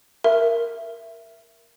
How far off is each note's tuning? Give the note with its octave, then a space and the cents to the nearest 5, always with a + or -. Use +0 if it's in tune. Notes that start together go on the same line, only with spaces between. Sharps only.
A#4 +0 E5 +15